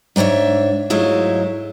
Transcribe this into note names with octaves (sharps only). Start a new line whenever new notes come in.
G#2 D4 G4 C#5 E5
G#2 F#3 G#3 A3 E4 F4